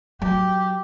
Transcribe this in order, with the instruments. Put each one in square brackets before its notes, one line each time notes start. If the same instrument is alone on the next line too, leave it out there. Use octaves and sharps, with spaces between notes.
[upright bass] F#3 [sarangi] G4